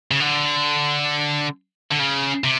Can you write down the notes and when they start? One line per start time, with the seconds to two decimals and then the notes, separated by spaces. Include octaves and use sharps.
0.11 C#3
0.20 D3
1.91 D3
2.00 C#3
2.44 C3